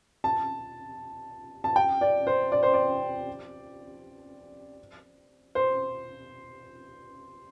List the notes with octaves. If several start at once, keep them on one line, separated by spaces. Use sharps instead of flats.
A5
A5
G5
D5
C5
D5
C5
D5
C5